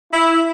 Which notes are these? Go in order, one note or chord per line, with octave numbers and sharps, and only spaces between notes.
E4